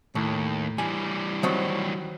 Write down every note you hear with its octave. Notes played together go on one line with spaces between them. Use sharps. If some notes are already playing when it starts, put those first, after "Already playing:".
D#2 A2
E3 G3 G#5
D#3 F#3 C4